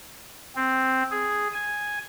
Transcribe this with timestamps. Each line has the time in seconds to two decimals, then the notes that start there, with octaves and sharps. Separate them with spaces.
0.55 C4
1.11 G#4
1.54 G#5